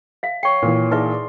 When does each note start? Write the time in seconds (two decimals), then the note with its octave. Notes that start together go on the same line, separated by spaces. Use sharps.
0.23 E5 F5
0.43 C#5 G5 C#6 C7
0.62 A#2 E3
0.91 D#4 G#4 B4 D5 E5 C6